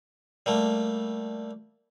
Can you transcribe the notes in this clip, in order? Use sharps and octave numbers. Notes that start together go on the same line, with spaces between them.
G3 A3 A#3